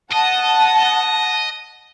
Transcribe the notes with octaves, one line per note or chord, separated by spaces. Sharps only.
D#5 F#5 A5